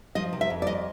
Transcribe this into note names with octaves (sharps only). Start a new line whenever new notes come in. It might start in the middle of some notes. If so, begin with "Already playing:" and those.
F3 D#5
C3
E5
F2
D5
F2 D#5